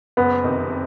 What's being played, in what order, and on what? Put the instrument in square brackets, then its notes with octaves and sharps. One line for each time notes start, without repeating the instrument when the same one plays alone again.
[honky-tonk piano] F#1 [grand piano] B3
[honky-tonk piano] F2 C3 D#3